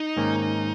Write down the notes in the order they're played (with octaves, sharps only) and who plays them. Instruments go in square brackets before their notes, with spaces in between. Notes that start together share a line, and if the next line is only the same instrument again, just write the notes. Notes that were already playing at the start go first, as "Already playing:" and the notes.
Already playing: [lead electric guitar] D#4
[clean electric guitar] G#2 D#3 A#3 C#4